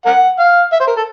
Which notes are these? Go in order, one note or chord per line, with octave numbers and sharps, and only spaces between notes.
A#4 F#5
F5
E5
C5
A#4
A4